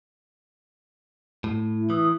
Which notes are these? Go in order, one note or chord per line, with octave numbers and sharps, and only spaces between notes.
A2
E4
E3 D#6